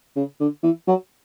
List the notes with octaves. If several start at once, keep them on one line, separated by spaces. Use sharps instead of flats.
C#3
D3
E3
F#3